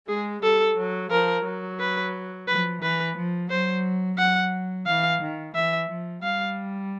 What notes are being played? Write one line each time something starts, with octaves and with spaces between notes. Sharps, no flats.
G#3 G#4
G3 A4
F#3
F3 A#4
F#3
B4
F3 B4
E3 B4
F3
F#3 C5
F#3 F#5
E3 F5
D#3
E3 E5
F3
G3 F5